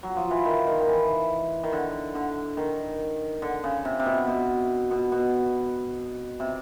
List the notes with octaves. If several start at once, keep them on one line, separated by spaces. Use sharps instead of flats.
F#3
F3
E3
D#3
D#3
D#3
E3
D#3
D3
D3
D#3
D3
C#3
C3
C3
B2
B2
B2
B2
C3